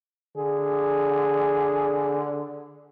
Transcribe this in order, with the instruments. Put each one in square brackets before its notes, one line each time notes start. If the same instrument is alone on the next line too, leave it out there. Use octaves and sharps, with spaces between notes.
[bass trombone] D3 [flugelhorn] G#4